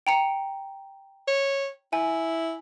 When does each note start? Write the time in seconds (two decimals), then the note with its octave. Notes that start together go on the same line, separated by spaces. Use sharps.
0.07 G5 A#5 C#7
1.28 C#5
1.93 E4 G#5